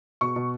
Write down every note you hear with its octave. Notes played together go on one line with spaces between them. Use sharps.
B2 C#6
B2